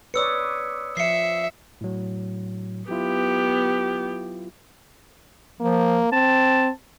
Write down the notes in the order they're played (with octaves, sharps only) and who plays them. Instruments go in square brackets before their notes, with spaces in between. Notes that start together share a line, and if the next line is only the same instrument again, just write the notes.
[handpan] B4 C#5 D5 [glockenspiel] D#6 E6 C#7
[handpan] F3 [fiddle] E5 [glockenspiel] C7 C#7
[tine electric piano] A2 F#3
[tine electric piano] F#3 E4 F4 [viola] B3 G4
[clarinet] F3 [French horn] A#3
[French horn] C4 [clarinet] A5